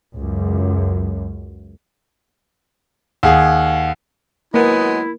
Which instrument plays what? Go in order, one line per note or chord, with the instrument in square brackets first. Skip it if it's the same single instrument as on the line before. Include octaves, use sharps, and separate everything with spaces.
[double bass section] C#2 F#2
[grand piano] D#2 G#4 [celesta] F5 F#5
[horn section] F#3 G#3 B3 [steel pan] A#3 [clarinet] E4